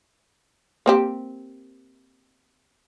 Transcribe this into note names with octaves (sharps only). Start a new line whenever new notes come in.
A#3 C4 G4